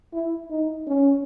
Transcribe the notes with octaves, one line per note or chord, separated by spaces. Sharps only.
E4
D#4
C#4